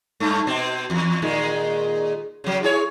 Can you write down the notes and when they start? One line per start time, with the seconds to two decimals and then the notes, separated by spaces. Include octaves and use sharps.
0.20 G2 A3
0.47 B2 C4
0.90 E2
1.22 A#2 D#3 G#3
2.44 C#3 F#3
2.63 E4 G#4 C#5